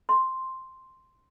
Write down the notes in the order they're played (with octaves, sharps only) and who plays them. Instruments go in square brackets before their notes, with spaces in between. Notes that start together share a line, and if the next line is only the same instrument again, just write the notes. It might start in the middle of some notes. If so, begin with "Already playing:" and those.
[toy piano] C6